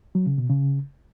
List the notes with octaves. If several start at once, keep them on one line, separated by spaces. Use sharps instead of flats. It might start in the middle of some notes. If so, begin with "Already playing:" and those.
F#3
C#3
B2
C#3